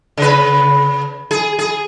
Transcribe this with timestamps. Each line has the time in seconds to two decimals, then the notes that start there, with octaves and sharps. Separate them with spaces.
0.17 C#3 B4
1.31 G#4
1.59 G#4